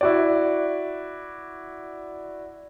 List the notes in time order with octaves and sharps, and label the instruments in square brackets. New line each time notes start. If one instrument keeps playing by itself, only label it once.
[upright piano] E4 F#4 D5